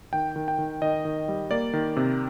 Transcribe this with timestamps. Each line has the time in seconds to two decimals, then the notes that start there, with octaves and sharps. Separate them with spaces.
0.13 D#3 G5
0.36 D#3
0.48 G5
0.58 D#3
0.82 D#3 D#5
1.05 D#3
1.28 G3
1.51 A#3 D5
1.73 D#3
1.97 C3